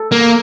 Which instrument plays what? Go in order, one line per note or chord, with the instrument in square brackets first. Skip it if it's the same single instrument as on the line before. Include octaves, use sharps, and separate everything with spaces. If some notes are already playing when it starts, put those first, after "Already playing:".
Already playing: [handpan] A4
[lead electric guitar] A#3